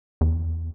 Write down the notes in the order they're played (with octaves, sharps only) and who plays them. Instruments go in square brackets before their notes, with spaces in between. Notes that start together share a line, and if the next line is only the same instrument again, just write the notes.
[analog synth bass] E2